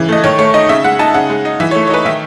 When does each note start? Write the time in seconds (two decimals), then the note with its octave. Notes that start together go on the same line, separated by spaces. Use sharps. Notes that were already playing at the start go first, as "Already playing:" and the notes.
Already playing: C#3 E3
0.09 A3 D#5
0.24 D#3 C#5
0.39 A3 C#5
0.54 D#4 D#5
0.69 C#3 E5
0.84 G#3 F#5
0.99 D#4 A5
1.14 C#3 F#5
1.30 G#3
1.45 D#4
1.60 E3 E5
1.71 C#5
1.75 A3
1.87 C#5
1.90 D#4 B4
2.05 D#3 E5